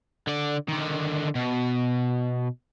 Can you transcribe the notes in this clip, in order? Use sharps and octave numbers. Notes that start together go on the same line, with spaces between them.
D3 D5
D3 D#3
B2